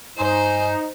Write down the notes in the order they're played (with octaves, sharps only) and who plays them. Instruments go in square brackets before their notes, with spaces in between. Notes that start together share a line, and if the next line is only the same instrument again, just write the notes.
[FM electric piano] G2 C6 [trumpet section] D#4 [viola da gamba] C5 [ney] G#5